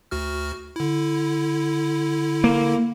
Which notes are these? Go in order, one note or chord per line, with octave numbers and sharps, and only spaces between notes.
D2 F#4 F6
D3 E4
A#3